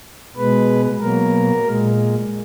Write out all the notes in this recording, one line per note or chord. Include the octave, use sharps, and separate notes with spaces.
B2 G#3 B4
B2 F#3 A#3 A#4
A#2 G#3